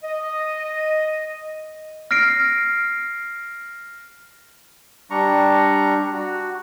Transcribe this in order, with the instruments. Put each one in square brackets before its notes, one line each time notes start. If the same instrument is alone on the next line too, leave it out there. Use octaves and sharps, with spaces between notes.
[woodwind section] D#5
[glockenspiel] F6 A#6 C7 D7
[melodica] G3 D4 A#5 C#6
F#4